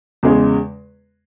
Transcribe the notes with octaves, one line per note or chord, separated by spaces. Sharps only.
E2 C#3 G#3